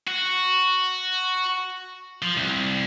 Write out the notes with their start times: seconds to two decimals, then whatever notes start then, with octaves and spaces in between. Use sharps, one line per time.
0.07 F#4
2.22 F3
2.37 C2